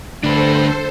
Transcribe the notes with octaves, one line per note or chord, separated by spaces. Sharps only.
D2 D4 A4 B4 C5